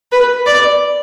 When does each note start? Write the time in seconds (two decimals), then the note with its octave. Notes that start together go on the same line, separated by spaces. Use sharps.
0.12 B4
0.46 D5